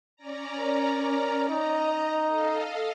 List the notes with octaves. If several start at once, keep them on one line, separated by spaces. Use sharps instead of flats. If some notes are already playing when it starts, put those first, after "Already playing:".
C#4 D5 A#5
A#4
A#4
D#4 D#5 A#5
A4 D#5 F5